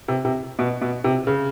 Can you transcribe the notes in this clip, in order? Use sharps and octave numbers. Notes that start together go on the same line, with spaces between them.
C3
C3
B2
B2
C3
C#3